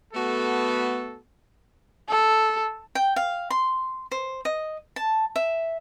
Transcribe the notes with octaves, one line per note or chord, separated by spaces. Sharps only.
A3 B3 F#4 A4
A4
G5
F5
C6
C5
D#5
A5
E5